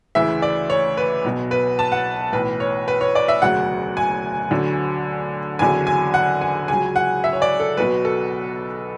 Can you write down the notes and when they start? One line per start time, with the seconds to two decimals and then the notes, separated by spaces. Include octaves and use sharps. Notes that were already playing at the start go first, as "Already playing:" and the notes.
0.15 D2 C#3 E3 E5
0.42 D5
0.70 C#5
0.97 B4
1.24 B1 B2 F#3
1.51 B4
1.79 A5
1.92 F#5
2.33 B1 A2 E3 B4
2.60 C#5
2.88 B4
3.01 C#5
3.15 D5
3.28 E5
3.42 E1 D2 C#3 F#3 F#5
3.97 G#5
4.51 D2 D3 F#3
5.59 F#1 E2 D3 F#3 G#5
5.87 G#5
6.14 F#5
6.41 G#5
6.68 C#2 C#3 F#3 G#5
6.96 F#5
7.24 E5
7.33 C#5
7.42 D5
7.60 A4
7.77 B1 B2 F#3 B4
8.05 A4